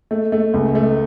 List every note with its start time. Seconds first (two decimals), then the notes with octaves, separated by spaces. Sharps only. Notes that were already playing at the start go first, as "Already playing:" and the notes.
0.11 A3
0.32 A3
0.54 C#2
0.75 A3